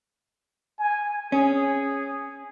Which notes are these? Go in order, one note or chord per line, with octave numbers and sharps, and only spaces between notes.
G#5
C#4 G#4